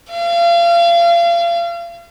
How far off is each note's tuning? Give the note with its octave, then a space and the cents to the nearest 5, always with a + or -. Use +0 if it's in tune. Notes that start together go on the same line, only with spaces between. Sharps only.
F5 -35